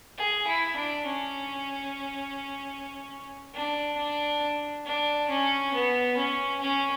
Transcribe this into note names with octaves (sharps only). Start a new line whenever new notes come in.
G#4
E4
D4
C#4
D4
D4
D4
C#4
B3
C#4
C#4